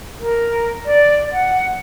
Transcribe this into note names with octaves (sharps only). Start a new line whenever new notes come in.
A#4
D5
F#5